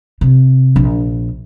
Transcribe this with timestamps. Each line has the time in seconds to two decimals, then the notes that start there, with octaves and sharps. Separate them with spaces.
0.21 C3
0.76 A#1